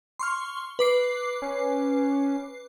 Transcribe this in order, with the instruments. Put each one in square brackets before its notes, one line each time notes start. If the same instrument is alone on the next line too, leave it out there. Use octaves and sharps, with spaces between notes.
[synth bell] C6 C#6 F6
B4 D6 C7
[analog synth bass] C#4